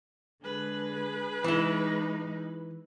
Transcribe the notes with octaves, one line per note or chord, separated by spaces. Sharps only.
D3 G#3 G#4 B4
E3 G#3 D#4 E4